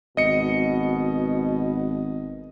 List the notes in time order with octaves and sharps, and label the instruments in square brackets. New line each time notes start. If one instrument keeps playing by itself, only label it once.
[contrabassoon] G#1 [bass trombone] B2 [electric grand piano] D#5 C#7